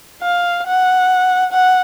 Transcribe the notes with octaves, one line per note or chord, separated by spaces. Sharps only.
F5
F#5
F#5